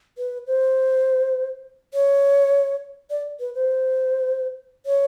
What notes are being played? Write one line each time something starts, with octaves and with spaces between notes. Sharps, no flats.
B4
C5
C#5
D5
B4
C5
C#5